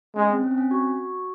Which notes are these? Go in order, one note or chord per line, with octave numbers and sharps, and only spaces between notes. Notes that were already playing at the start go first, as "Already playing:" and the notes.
G#3 C#4
C4
C#4
C4
C#4
F#4